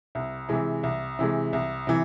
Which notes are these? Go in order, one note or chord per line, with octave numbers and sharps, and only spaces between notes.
C2
C3 E3 G#3
C2
C3 E3 G#3
C2
C3 E3